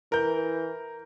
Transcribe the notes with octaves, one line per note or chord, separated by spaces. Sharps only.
E3 A#4 G6